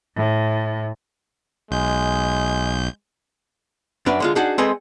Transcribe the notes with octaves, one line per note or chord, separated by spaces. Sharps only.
A2
B1 G#3 G6
F#2 D4 B4 D5
D3 G#3 F4
D4 D#4 F#4 G#4 F#5
G#3 C4 A4 B4 D#5 G#5